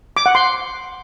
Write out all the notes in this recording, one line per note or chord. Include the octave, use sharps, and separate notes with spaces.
D6
F#5
C6